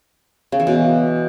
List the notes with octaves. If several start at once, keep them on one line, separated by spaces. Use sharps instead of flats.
C#3
E3
B2